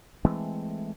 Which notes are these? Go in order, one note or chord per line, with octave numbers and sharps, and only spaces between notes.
E3 G#3 A3 C4